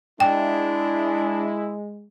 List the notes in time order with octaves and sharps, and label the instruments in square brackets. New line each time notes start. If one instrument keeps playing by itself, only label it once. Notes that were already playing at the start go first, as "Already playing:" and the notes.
[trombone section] G#3 [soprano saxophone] D4 [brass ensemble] E4 [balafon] G5